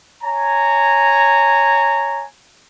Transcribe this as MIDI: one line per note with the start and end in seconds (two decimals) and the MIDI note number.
0.23 2.25 73
0.23 2.25 80
0.23 2.25 82